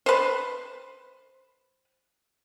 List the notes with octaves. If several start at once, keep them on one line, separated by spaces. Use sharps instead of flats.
B4 C5